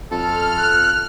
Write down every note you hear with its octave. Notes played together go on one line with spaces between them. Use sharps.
F2 A4 F6
F#6